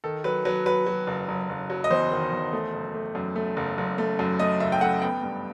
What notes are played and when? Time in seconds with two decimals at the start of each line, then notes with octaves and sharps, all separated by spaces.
0.04 D#3 A4
0.24 F#3 B4
0.45 F#3 B4
0.66 F#3 B4
0.87 F#3
1.07 F#1
1.28 F#1
1.49 F#1
1.70 F#3
1.84 D#5
1.90 E2 C5
2.11 D#3
2.32 E2
2.53 A3
2.73 F#1
2.94 A3
3.15 F#2
3.36 A3
3.56 F#1
3.78 F#1
3.98 A3
4.19 F#2
4.39 A3 D#5
4.60 F#1 E5
4.72 G5
4.81 A3 F#5
5.02 B3 G5
5.23 G2